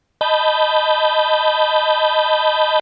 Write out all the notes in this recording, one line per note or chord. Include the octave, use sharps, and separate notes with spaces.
D#5 A5 B5 G6